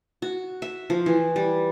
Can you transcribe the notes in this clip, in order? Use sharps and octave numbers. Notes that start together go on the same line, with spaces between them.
F#4
E5
F3
E3
G3